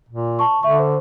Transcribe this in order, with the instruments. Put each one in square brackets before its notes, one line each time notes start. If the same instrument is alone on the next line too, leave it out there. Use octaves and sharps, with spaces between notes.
[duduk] A#2
[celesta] A5 C#6
[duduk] D3 [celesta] E5 C#6
[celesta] C5